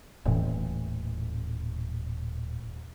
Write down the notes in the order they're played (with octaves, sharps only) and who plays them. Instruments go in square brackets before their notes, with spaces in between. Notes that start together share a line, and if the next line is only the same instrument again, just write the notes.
[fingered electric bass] D#1 A2 E3